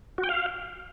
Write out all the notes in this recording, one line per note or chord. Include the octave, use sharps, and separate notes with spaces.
F#4
G5
F5